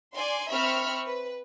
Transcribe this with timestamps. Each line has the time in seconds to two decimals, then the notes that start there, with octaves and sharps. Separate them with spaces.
0.14 D5 G#5 C6
0.49 C4 E5 B5 C#6 F6
1.06 B4